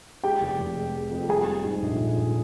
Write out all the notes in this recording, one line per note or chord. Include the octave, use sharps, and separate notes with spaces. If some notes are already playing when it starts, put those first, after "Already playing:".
G#3 G4 G5
F1
F1
G#3
G#3
F2
G3 G#4 G#5
G3
G#2
A#1
A#1
A#1